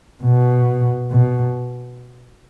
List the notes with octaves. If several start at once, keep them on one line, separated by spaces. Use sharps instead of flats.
B2
B2